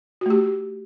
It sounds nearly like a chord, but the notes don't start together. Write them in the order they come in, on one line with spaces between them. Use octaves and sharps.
F#4 A3 G4